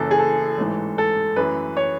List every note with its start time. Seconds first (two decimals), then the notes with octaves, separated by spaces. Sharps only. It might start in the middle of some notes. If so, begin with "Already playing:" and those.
Already playing: F#1 F#2 E3 A4
0.11 G#4
0.19 A4
0.58 A1 G#2 E3
0.98 A4
1.36 F#2 E3 A3 B4
1.77 C#5